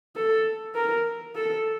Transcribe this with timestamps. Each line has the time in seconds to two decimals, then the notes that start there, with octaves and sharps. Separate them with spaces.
0.16 A4
0.75 A#4
1.36 A4